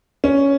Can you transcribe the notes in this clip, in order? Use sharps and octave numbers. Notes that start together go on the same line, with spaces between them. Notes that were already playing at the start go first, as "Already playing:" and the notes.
C#4